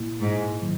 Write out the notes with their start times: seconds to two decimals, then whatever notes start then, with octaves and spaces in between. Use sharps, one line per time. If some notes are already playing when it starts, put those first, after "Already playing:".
Already playing: A#2 A#3 E4
0.20 G#2
0.62 D#3 F#3